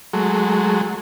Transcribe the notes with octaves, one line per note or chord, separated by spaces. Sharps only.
F#3 G#3 A3